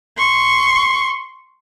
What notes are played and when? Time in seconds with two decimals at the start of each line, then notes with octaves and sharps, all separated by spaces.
0.17 C6 C#6